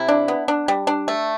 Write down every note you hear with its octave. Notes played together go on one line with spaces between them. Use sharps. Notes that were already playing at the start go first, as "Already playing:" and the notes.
Already playing: C3 E4
D4
B3
D4
G3
D4
A3